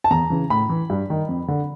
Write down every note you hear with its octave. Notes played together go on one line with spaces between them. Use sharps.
A5
E2 A#5
C#3 E3
A2 B5
E3
G2
D#3
F2
D3